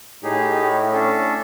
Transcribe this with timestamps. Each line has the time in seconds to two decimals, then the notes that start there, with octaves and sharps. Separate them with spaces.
0.24 A2 D#4 G4 G#4
0.93 C#4 D4 A4